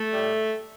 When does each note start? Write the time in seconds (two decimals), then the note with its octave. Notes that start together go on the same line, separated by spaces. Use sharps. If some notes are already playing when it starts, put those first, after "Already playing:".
Already playing: A3
0.13 A2 G3